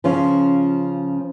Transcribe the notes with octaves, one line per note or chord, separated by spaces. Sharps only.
C#3 F3 C#4 F4